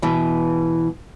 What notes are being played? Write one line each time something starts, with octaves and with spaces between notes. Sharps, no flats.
B2 E3